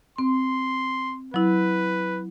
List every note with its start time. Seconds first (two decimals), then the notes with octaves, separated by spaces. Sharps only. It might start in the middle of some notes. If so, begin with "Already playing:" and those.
0.18 C4 C6
1.34 F#3 E4 B4